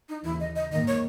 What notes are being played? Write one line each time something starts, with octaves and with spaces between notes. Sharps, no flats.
D#4
D#2 C#3 E3 E4
D#5
D#5
G#2 D#3 A#3 D#5
C#5